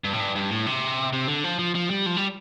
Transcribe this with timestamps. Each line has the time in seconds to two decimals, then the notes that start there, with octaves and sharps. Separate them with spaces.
0.04 G2
0.13 A2
0.20 G2
0.35 G2
0.51 A2
0.67 C3
1.13 C3
1.28 D3
1.44 F3
1.59 F3
1.75 F3
1.90 G3
2.06 F3
2.17 G3